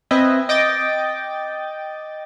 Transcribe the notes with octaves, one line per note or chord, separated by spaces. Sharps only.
C4 B4 D#5 E5 G#5
D#5 G5 D6 A6